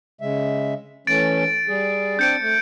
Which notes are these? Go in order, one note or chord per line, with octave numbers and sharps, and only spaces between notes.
C#3 G#3 E5
E3 A3 C#4 A6 D7
G3 G#4
C4 D4 G6 C#7 D7
A3